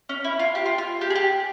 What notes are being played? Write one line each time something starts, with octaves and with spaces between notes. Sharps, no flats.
C#4
E4
F4
G4
F4
F4
G4
G#4
G4